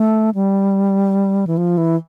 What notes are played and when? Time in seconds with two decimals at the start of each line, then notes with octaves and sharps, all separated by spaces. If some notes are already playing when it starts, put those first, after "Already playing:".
Already playing: A3
0.35 G3
1.47 E3
1.57 F3
1.78 E3